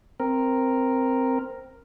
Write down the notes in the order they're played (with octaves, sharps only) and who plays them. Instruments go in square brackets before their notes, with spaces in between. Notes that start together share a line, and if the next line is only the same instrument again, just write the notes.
[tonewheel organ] C4 A#4